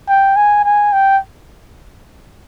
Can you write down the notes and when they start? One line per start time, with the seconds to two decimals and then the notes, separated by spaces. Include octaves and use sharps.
0.08 G5
0.36 G#5
0.65 G#5
0.93 G5